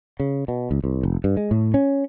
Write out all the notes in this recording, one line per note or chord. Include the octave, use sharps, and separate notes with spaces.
C#3
B2
C#2
C2
F1
G2
G#3
A2
C#4